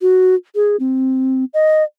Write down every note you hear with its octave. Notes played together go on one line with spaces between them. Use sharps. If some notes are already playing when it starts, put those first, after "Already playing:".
F#4
G#4
C4
D#5